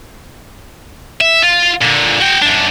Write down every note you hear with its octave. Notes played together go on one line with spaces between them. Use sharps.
E5
F4
A#2 D3
F#4 G5
F#2 D4